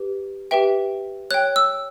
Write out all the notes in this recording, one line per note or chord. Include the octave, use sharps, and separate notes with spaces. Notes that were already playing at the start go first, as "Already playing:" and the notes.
Already playing: G4 B4
G4 B4 E5 G5
C#5 G5 F#6
E6